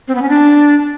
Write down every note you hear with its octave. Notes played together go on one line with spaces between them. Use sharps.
C4
B3
C#4
D4